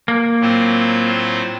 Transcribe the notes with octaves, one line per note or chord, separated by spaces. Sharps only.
A#3
A2 F#3 C4 F4 C5